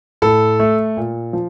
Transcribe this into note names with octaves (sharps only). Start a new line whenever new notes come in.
A2 A4
A3
A#2
F3